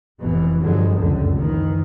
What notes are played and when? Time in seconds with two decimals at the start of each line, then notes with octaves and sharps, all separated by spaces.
0.20 F1 B2 E3
0.62 G2 D3 F3 F#3 G#3
0.97 F1 C#2 F#2 A#2 D3
1.36 F#1 D#3 E3